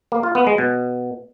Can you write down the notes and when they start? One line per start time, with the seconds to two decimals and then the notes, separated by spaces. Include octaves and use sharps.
0.12 A#3
0.23 F4
0.35 B3
0.47 G#3
0.58 B2